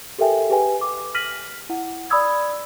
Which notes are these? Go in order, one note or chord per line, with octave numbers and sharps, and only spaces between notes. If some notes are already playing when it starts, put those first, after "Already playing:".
G4 A4 A#4 E5 G5 G#5
G4 G#4 B4 G5 G#5
D6
F6 A#6 B6 D#7 F#7
E4 F#5
D5 B5 D#6 E6 G#6